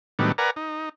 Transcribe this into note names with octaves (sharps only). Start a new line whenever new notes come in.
A2 D#3 F#3 G3 B3 D4
A#4 B4 D5 F#5 G#5 A#5
D#4